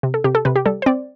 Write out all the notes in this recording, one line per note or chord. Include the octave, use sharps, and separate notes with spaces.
C3
A4
C3 G4
A4
C3 B4
G4
G3 A4
C5
C4 D5